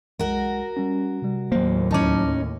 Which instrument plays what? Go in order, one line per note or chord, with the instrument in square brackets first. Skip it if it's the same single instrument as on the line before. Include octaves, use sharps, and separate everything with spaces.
[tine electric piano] B1 G#3 [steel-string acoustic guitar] F#4 A#4
[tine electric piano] G3 C#4
C3 G3
[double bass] D#2 A2 [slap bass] F#3 A#3 [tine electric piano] C5
[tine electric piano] D2 A5 D6 [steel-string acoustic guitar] C#4 D#4